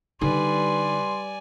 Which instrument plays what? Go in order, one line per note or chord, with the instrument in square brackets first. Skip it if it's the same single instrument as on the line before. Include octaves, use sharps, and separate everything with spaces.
[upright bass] D3 D#4 [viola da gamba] G3 B4 [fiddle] D5 G#5 [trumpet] C6